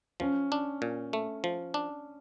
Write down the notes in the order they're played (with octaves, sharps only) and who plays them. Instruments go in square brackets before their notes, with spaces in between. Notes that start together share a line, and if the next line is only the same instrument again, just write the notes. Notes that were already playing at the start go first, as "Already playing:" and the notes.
[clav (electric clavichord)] F3 [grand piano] C#4
[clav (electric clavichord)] D4
A#2
A3
F3
D4